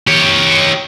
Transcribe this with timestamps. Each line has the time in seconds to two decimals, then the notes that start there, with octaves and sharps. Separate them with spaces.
0.07 G4 C#5